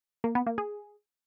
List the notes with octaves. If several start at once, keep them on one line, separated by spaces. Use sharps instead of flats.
A#3
B3
A#3
G#4